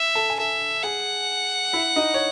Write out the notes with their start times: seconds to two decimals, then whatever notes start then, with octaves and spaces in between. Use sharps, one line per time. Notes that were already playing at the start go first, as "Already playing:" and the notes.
Already playing: E5
0.15 A4 A5
0.30 G#5
0.38 A4 E5 A5
0.83 G#4 F#5 G#5
1.73 E4 E5
1.96 D#4 D#5
2.14 C#5